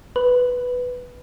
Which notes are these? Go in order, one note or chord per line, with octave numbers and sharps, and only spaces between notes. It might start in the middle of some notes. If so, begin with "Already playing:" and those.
B4